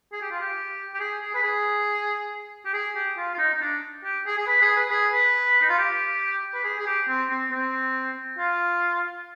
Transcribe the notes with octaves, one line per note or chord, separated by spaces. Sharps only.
G#4
G4
F4
G4
G4
G#4
G#4
B4
G#4
G4
G#4
G4
F4
F4
D#4
D#4
D4
G4
G#4
G#4
B4
G#4
B4
G#4
B4
D#4
F4
G4
B4
G#4
G#4
G4
C4
C4
C4
F4